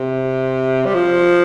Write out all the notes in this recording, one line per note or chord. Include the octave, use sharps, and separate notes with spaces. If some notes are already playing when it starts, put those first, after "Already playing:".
Already playing: C3
G3
F3